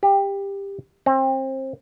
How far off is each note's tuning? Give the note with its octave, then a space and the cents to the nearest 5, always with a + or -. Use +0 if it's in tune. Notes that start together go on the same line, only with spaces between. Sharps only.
G4 +15
C4 +30